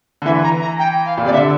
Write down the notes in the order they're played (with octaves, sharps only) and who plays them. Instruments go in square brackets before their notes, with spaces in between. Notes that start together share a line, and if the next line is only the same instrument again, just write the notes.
[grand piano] D3
[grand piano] E3 [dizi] E5
[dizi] A#5
A#5
G5
F5
[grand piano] A#2
[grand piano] C3 [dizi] D5
[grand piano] D3 [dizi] E5